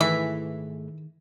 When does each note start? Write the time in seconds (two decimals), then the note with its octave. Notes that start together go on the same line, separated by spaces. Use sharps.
0.01 G#2 D#3 E3 A3 G#4 E5